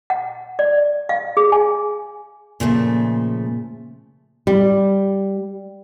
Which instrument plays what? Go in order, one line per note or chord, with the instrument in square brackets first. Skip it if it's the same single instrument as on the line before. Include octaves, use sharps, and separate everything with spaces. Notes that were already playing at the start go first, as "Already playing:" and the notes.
[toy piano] F#5
D5
F5
G#4
G#5
[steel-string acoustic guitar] A#2 C#3 F3 A3
[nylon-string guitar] G3